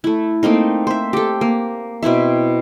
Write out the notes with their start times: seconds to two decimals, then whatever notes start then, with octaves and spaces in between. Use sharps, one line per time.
0.04 A3 E4
0.43 A3 A#3 C4 D#4
0.87 C5 E5
1.13 G4 A4
1.41 A#3
2.03 B2 C4 E4 E5